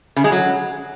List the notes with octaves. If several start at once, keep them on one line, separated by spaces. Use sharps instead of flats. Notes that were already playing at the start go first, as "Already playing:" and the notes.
C#3
G#3
F#3